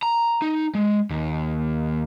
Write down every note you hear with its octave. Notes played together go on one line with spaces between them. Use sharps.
A#5
D#4
G#3
D#2